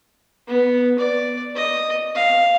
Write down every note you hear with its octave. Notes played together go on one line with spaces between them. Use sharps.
B3
D5
D#5
F5